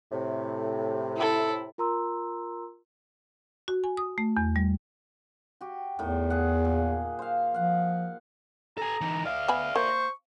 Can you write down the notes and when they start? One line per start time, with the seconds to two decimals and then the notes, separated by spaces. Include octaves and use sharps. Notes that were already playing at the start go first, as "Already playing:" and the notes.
0.12 A2 C3
1.16 E4 A4
1.78 F4 A#4 A#5 C6 E6
3.68 F#4
3.84 G#5
3.97 D#6
4.18 A3
4.37 E2
4.56 G3
5.61 F#4 G4
5.99 E2 A2 D#3
6.30 G#4 F#5
6.65 A#2
7.19 C5 F5
7.54 F3 F5 F#5
8.78 A4 G#5 A#5
9.01 E3 D#4
9.25 D5 E5 F5
9.48 B3 G#5 B5
9.76 A#3 C5 C#6